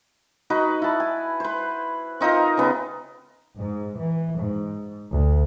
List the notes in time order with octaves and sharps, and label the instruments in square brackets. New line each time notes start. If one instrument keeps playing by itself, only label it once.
[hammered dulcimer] D#4 F#4 B4
E4 A5
G#5
B4 C5
C4 D#4 F4 A#4
C#3 B3
[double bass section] G#2
E3
G#2
D2